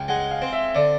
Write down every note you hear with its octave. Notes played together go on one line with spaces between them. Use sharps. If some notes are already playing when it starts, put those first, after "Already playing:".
Already playing: C#2 G5
G#3 F#5
F5
C4
E5
D3 D5